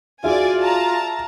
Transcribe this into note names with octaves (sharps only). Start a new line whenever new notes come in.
F4 F#4 G#4 D5 E5 G#5
A5 A#5